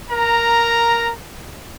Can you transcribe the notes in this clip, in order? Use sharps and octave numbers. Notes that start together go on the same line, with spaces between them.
A#4 A#5